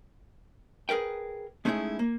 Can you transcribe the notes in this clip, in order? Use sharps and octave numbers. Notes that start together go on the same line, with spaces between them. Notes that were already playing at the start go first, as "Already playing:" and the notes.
G#4 A#4 B4 G5
G#3 A3 C#4 D#4 E4 G#4
A#3